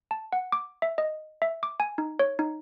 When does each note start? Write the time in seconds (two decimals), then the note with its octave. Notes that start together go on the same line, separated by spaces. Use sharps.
0.11 A5
0.32 F#5
0.52 D6
0.82 E5
0.98 D#5
1.42 E5
1.63 D6
1.80 G#5
1.98 D#4
2.19 C#5
2.39 D#4